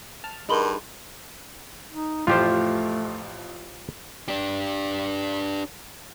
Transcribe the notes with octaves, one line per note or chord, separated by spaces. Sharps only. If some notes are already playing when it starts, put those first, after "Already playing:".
A5 F6
G2 D#4 G#4 A#4 B5 C6
D#4
A1 F2 F3 A3 F4 G4 C5
D4 G4